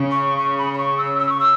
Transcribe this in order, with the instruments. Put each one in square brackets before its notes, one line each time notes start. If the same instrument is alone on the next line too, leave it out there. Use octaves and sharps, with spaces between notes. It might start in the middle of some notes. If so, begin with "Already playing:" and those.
Already playing: [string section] C#3
[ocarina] C#6
C#6
B5
B5
C#6
E6
E6
C#6
E6